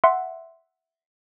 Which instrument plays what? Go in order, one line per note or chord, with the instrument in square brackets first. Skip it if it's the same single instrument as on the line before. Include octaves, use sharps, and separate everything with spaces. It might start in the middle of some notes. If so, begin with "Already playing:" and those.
[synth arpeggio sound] E5 F#5 C6